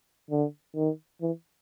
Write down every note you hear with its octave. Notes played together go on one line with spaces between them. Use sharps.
D3
D#3
E3